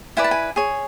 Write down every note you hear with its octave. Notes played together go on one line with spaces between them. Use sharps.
E4 B4 D5 G#5
A5
G#5
G#4 C#5